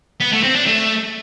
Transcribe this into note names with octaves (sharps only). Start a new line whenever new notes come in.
B3
A3
C4
D4
A3